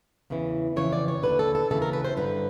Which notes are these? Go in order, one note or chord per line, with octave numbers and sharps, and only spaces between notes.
E2 C#3 E3
F2 C#3 E3 C#5
D5
C#5
D#2 D3 B4
A4
A4
D#2 C#3 E3 A4
A#4
B4
C5
G2 D3 B4